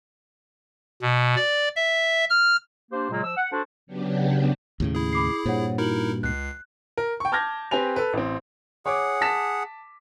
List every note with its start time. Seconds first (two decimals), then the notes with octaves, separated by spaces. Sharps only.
1.02 B2
1.36 D5
1.76 E5
2.30 F6
2.91 A#3 D4 G4 C5
3.10 A#2 C#3 F#3 G#3 A#3
3.24 F3 E6
3.37 F#5
3.52 D4 F#4 A4 C5
3.87 C#3 F#3 B3 D4 G4
4.80 D#2 A2 C#3
4.95 E4 G#4
5.13 B5 D6 C7
5.45 G2 A#2 C5 C#5 F#5
5.78 D#4 E4 F#4 A#4 F#7
6.23 C#2 F#6 C7
6.97 A#4
7.20 G5 C#6
7.32 A5 D6 F6 G6 G#6 A#6
7.71 C4 G4 B4 G#5 F7
7.96 A4 B4
8.13 A1 C4
8.86 G#4 C#5 F#5 D6
9.21 A5 B6 E7